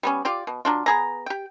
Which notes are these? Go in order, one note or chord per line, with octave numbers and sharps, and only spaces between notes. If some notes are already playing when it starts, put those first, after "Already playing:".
G3 B3 C#4
F4 G4 D5
B2
F#3 D4 F4
B3 G#4 A#5
G4 G5